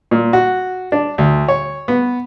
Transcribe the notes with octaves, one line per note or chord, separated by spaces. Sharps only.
A#2
F#4
D4
D2
C#5
B3